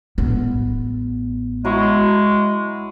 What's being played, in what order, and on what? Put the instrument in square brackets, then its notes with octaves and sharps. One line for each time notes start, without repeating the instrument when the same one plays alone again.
[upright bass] A1 B3
[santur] F#3 E4 C#6 [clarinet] G#3